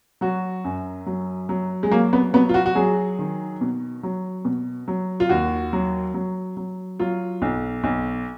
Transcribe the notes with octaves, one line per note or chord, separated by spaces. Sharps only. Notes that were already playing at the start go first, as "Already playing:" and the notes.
F#3 F#4
F#2
F#3
F#3
G#3
F#3 A#3
B3
F#3 B3
F4
F#4
F#4
F#3 G#4
D#3
B2
F#3
B2
F#3
F4
D#2 F#4
F#3
F#3
F#3
F#3 F4
B1
B1